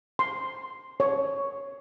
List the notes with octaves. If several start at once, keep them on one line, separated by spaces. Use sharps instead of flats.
C6
C#5